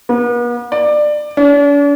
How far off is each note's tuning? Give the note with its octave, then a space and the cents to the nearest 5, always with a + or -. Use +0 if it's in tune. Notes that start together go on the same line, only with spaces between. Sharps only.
B3 -45
D5 +20
D4 -45